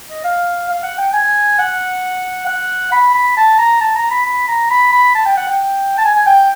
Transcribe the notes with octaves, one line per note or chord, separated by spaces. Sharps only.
D#5
F5
F5
F#5
G5
G#5
F#5
F#5
B5
B5
A5
A#5
A5
A#5
B5
B5
A#5
B5
B5
A5
G5
F#5
G5
A5
G#5
G#5
G5